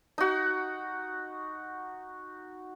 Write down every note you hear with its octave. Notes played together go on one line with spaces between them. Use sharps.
D#4 F#4